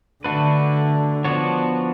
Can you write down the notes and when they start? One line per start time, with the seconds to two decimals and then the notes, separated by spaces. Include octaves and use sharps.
0.24 D3 A3 D4 F#4 B4
1.25 F3 B3 D4 F#4 C#5